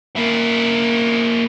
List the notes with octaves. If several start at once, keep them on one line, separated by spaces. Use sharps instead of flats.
A#3 E4